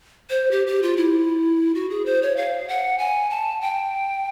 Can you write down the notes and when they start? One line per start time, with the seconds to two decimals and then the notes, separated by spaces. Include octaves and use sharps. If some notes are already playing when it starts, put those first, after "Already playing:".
0.30 C5
0.51 G4
0.67 G4
0.82 F4
0.97 E4
1.75 F#4
1.90 G#4
2.06 C5
2.22 C#5
2.37 F5
2.68 F#5
2.99 G#5
3.30 A5
3.61 G5